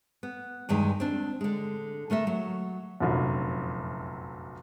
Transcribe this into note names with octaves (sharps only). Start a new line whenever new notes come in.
B3
E2 G2 D#3 G#3
C4 D4
D3 G#3
D3 A3 A#4 E5
F#3
F1 A#1 F#2